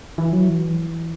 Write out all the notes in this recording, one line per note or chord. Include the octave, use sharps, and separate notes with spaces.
E3
F#3
E3